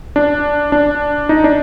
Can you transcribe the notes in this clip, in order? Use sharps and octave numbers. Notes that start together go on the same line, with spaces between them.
D4
D4
D#4
D4